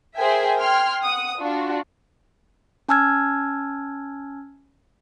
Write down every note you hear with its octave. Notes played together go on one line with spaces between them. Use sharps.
G#4 A#4 C5 E5 G5 G#5
G5 C6 F6 G#6
F#5 D#6
D4 F4 F#4
C#4 G#5 A5 E6 F6 G#6